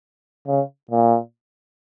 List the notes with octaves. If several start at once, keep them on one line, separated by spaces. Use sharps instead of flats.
C#3
A#2